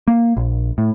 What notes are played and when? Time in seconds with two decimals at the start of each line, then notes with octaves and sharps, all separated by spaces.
0.08 A#3
0.37 A#1
0.78 A2